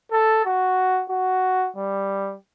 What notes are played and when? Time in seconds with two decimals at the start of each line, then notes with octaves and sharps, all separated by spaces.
0.12 A4
0.45 F#4
1.10 F#4
1.76 G3